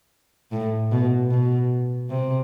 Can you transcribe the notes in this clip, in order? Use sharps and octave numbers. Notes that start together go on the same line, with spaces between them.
A2
B2
B2
C3